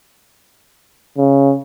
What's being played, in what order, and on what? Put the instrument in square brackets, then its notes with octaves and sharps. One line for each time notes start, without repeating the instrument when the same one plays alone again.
[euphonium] C#3